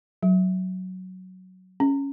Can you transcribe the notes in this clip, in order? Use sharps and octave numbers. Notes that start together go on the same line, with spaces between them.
F#3
C#4